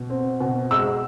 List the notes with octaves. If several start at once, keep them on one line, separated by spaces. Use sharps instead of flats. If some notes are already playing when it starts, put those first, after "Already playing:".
Already playing: B2
C4
B2
G#3 E6